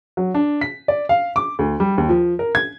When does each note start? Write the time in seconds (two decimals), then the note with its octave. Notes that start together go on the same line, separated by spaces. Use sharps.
0.17 F#3
0.34 D4
0.61 B6
0.88 D5
1.09 F5
1.36 D6
1.59 D2
1.80 G3
1.98 D#2
2.09 F3
2.39 A#4
2.55 G#6